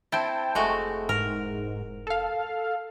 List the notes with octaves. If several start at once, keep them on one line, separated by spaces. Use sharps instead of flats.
C4 E4 G5 A5
F1 G#3 A3 F#4
G#2 A#4
A4 F5